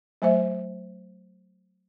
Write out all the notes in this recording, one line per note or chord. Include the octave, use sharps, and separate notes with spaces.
F#3 A3 C5 E5